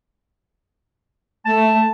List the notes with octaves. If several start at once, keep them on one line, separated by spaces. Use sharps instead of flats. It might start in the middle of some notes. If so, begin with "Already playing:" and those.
A3 A5